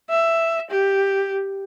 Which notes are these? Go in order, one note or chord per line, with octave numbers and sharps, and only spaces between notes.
E5
G4